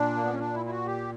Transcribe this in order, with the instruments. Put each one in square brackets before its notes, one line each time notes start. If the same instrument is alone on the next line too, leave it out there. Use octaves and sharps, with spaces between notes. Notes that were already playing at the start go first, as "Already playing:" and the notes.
Already playing: [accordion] A#2 D4
A#3
B3
C#4
D4
E4
E4
F#4
G4